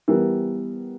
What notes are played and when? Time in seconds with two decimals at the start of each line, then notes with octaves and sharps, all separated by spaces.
0.08 E3 G3 B3 G4 A#4